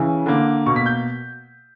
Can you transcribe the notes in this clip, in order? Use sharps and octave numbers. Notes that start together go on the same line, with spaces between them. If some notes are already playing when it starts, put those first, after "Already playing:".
Already playing: C#3 E3
D3 A#3
B2 A#3 C#6
B6
G6